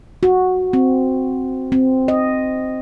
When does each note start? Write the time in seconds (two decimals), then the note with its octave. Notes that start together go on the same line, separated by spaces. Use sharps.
0.23 F#4
0.73 C4
1.72 C4
2.08 D#5